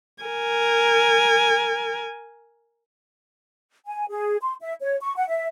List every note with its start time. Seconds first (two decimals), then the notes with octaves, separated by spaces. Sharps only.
0.23 A#4 G#5
3.86 G#5
4.10 G#4
4.41 C6
4.62 E5
4.81 C#5
5.01 C#6
5.17 F#5
5.29 E5